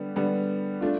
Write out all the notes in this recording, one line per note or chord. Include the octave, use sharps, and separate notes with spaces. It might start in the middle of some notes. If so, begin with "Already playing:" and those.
Already playing: D3 G3 B3
D3 G3 B3
A3 D4 F4